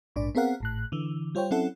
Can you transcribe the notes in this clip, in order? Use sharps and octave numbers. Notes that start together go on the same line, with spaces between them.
A#1 G#2 D4 D5
B3 C4 G#4 A#4 F5 F#5
G#1 A2 F#6
D3 E3
G3 F4 C5 C#5 G5
F#3 C4 C#4 E4 A4 F#5